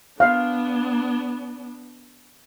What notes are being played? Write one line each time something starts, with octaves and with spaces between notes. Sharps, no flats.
B3 D4 F5